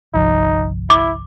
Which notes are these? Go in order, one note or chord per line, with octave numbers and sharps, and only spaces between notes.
G1 C2 F3 D#4
E4 D6